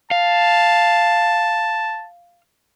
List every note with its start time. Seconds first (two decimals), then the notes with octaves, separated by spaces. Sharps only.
0.11 F5 A5